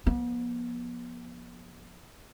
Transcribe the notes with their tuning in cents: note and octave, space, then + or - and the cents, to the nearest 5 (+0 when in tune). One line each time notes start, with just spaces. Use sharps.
F3 +0 B3 -40